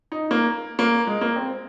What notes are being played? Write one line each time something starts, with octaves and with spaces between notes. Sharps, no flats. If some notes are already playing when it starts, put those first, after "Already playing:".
D#4
A#3
A#3
G#3
A#3
C4